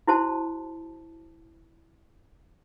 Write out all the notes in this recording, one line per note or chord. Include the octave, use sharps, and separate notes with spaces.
E4 F#4 C5 A5